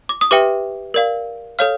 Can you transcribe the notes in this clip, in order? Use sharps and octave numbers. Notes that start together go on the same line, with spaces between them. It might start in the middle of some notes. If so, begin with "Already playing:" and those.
D6
D#6
G4 B4 E5 G5 D6
A#4 D5 F5
A4 C#5 F5 F6